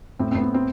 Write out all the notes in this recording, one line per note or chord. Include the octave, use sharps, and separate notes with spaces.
A2 C4
C4
A2 B3
C4
C4